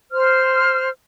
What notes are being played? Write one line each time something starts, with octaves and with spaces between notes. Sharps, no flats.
C5 F6